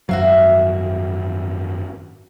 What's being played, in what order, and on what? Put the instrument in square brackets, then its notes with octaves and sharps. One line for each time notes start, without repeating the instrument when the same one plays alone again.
[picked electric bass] G#1 F#2 F#3 [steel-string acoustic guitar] F#4 E5 F5